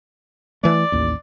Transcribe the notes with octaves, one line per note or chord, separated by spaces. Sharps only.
E3 A3 D5
A1 D#2